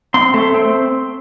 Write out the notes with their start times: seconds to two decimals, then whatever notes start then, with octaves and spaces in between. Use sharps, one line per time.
0.14 C4 C6
0.34 A3
0.54 C4